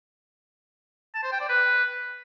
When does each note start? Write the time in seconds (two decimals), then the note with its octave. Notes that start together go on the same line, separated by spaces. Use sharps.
1.15 A5
1.24 C5
1.32 G5
1.41 D5
1.49 B4